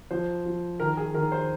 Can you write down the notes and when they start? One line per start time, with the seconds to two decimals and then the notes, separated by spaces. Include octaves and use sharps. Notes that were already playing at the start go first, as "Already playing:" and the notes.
0.11 F3 C5
0.46 F3
0.80 D#3 A#4
0.97 G#4
1.15 D#3 A#4
1.32 C5